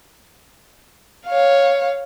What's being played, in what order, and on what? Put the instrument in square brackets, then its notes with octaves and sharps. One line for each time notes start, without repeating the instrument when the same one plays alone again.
[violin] C#5 F5